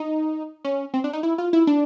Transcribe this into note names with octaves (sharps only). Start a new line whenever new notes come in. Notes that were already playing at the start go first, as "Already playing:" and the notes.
Already playing: D#4
C#4
C4
D4
D#4
E4
F4
E4
D4